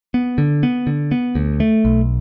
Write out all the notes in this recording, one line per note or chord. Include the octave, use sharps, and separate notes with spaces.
B3
D3
B3
D3
B3
D2
A3
B1